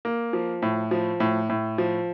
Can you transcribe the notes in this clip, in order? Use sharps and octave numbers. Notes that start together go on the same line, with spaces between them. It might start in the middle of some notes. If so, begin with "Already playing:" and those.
A#3
F3
A2
F3
A2
A2
F3